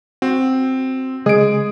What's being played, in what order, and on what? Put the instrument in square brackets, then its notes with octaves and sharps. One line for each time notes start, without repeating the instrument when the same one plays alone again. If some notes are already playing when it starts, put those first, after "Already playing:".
[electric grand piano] C4 [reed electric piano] F#4
[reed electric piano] C#3 G#3 D#6 [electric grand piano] G#4 D7